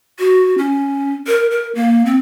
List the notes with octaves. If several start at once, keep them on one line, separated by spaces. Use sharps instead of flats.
F#4
C#4
A#4
A#4
A#3
C4